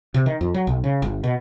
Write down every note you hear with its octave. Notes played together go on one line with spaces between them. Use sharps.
C3
D#3
F2
F#3
B1
C#3
G1
B2